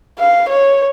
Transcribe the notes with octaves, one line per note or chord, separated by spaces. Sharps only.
F5
C#5